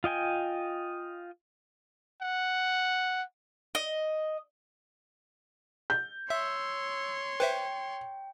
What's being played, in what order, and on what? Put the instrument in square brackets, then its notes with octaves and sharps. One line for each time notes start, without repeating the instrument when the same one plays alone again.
[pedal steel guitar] F4 D#5 G5 G#5
[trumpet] F#5
[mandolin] D#5
[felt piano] G6
[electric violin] C#5 C6 [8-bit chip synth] E5 [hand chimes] E6
[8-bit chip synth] B4 C5 E5 [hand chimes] G5